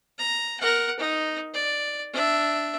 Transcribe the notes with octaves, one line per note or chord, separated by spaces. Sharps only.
A#5
A#4 F#5
D#4
D5
D4 E5